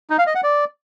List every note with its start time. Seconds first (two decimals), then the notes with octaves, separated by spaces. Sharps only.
0.10 D#4
0.18 F5
0.27 D#5
0.35 F#5
0.43 D5